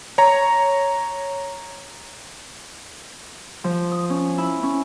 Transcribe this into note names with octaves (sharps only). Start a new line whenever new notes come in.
C#5 A#5
F3
D#6
C#4
E4
C#4